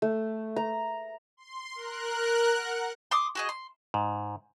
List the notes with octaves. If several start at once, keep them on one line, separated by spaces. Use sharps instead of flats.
A3
A#5
C6
A#4 F#6
F#5
C6 D6 D#6
F#4 G#4 D#5
C6
G#2